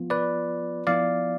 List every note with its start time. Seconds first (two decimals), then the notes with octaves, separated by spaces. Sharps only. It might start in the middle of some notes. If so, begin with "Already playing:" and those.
Already playing: F3 B3 F4
0.10 B4 D5
0.87 F3 B3 E4 D5 F5